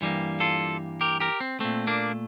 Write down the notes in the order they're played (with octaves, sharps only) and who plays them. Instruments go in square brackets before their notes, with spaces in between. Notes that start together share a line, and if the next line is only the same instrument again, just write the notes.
[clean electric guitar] G2 E3 G3 A#3
F4 A4
G4 A#4
G4 A#4
C4
A#2 A3 C4
A#3 D4